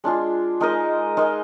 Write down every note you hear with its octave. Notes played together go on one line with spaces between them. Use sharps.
G#3 D4 F4 G#4
G#3 D#4 A#4 D#5
G#3 D#4 A#4 D#5